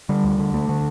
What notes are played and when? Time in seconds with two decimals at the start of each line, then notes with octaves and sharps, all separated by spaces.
0.09 D3 G3
0.24 D2
0.39 D3
0.53 D2 A3
0.69 D3